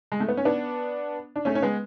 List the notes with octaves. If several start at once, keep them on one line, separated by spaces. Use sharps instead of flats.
G#3
A3
B3
C#4
B3 D4
D4
A3 C#4
C#4
G#3 B3